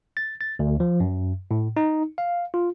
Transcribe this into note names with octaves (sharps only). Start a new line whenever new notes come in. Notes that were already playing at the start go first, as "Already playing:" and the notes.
A6
A6
D2
F3
F#2
A2
D#4
F5
F4